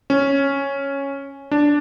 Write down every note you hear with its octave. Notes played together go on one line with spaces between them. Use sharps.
C#4
D4